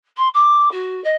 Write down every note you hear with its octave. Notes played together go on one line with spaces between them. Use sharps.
C6
D6
F#4
D#5